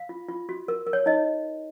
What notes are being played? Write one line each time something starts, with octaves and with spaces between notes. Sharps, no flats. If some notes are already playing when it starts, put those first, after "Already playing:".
Already playing: F5
F4
F4
F#4
A#4
A#4
C#5
D#4 D#5